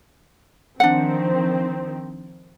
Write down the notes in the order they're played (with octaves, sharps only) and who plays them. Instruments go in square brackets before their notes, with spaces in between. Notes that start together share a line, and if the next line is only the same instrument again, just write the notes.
[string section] D#3 F3 C4 [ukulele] D4 F#5